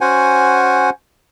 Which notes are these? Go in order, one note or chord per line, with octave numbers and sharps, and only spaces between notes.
C#4 F#4 C5 F#5 G#5